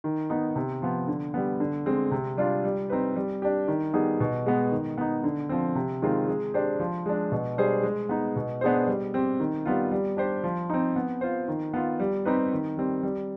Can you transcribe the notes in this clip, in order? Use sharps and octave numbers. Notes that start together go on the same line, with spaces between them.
D#3
B3 D#4
C3
F3 B3
D3
G3 B3
D3
G#3 C4
C3
G3 D4 F4
G3
C4 D#4 B4
G3
D4 G4
D#3
G3 B3 D#4 G#4
B2
G#3 B3
D#3
B3 D#4
D3
F3 C4
C3
D#3 G#3 C4 F4
G#3
D4 G4 C5
F3
G#3 D4
B2
G3 D4 G#4 C5
G#3
B3 D#4
B2
B3 D4 G#4 C5
G3
C4 G4
D#3
G3 B3 F4
G3
D4 G4 C5
F3
C4 D#4
B3
F4 C5
D#3
B3 F4
G3
C4 D#4 G4 B4
D#3
G3 C4
G3